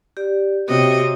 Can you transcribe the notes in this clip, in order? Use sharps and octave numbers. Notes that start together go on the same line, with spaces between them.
G4 D5
C3 F#4 C#5 D#5